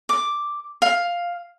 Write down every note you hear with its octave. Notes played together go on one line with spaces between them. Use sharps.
D6
F5